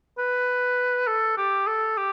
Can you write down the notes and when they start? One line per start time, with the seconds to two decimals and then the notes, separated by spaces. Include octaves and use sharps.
0.18 B4
1.07 A4
1.37 G4
1.67 A4
1.97 G4